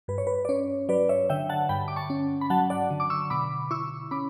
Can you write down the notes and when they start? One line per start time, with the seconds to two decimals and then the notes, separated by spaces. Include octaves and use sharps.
0.08 G2 B4
0.18 C#5
0.27 B4
0.45 D5
0.49 C#4 C#5
0.89 F#3 B4 D5
1.09 C#5 E5
1.30 D3 E5 G5
1.49 F#5 A5
1.69 G2 G5 B5
1.88 D6
1.96 A5 C#6
2.10 C#4
2.41 B5
2.50 F#3 F#5 A5
2.70 D5 F#5
2.90 D3
3.00 D6
3.10 C#6 E6
3.30 B2 B5 D6
3.71 E4 C#6 E6
4.11 C#4 B5 D6